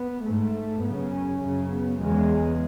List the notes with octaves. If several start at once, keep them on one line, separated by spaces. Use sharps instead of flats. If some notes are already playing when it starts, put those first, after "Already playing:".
Already playing: B3
G#2 A3
F#2 C#3 B3
C#4
F#2 C#3
B3
E2 C#3 G#3